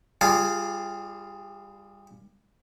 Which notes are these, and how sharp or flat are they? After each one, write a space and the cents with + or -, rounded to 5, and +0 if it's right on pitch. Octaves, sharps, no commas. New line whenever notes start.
G3 +25 F4 -10 G#4 +0